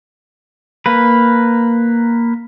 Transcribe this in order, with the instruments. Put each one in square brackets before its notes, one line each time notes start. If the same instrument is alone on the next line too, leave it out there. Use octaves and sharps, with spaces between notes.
[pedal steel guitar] A#3 B4